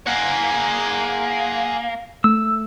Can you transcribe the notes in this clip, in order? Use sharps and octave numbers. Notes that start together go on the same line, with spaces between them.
A#3 G#4 F#5
A3 E6